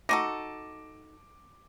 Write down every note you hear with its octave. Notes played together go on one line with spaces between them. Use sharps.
D#4 F#4 A4 D6 A#6 D#7